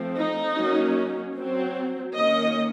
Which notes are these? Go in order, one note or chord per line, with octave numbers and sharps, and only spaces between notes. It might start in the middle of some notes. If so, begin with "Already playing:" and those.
Already playing: F3 A3 C4
D#4
F#3 A#3 C#4
F#3 C4
D#3 A#3 C#4 D#5